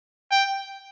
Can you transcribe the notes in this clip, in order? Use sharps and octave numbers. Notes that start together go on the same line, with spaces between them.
G5